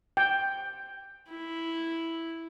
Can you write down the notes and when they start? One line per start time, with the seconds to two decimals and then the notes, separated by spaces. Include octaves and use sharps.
0.17 G5
1.30 E4